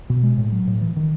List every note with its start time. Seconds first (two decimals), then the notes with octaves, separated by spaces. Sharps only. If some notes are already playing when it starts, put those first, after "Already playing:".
0.10 B2
0.23 G#3
0.38 A2
0.52 F#3
0.67 A2
0.81 E3
0.96 D#3